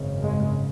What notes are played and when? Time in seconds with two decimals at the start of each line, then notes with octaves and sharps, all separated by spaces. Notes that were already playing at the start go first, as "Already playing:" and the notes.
Already playing: G#1 F#2 C#3
0.21 G#3